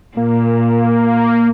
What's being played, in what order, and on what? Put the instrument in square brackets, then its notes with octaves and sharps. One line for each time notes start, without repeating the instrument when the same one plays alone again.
[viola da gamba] A#2 [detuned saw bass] A#3